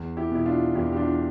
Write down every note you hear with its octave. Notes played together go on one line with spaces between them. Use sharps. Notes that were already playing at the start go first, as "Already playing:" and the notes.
Already playing: E2
E4 G4
B2 E4
D4 F4
E2 E4 G4
G4
D4 F4
D4